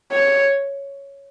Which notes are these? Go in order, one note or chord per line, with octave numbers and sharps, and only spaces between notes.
C#5